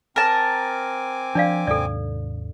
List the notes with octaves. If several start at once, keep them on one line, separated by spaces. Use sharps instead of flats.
C4 A#4 G#5 A5 D6
F3 D4 D5 F5
D#2 G#2 C3 A4 D5